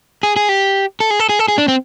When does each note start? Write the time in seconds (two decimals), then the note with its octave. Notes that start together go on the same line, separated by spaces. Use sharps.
0.23 G#4
0.36 G#4
0.49 G4
1.00 A4
1.10 G#4
1.20 A4
1.29 G#4
1.39 A4
1.48 G#4
1.58 D4
1.68 C4